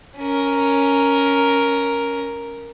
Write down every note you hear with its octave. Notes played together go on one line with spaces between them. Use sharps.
C#4 A#4